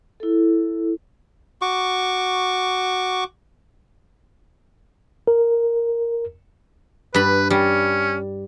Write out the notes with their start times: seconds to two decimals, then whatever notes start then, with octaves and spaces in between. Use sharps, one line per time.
0.20 E4 A4
1.62 F#4 C#6 D6
5.27 A#4
7.14 G2 B4 B5
7.50 G3 C#4